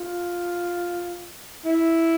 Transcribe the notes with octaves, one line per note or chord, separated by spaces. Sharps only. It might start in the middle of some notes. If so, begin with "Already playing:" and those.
Already playing: F4
E4